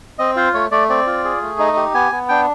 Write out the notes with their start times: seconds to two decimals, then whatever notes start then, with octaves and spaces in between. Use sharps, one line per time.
0.19 C4 D#5
0.36 F4 C5
0.54 A3 C#5
0.71 A3 D5
0.89 C4 D5
1.07 F4
1.24 G#4
1.42 A3
1.59 D#4 D#5
1.77 G4
1.94 B3 G#5
2.12 B3
2.29 D4 G5